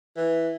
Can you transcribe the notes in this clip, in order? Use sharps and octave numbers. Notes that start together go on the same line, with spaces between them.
E3